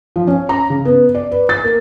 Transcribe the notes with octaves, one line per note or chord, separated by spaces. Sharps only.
F3
C#4
A#5
C#3
B3
D5
B4
A6
A#3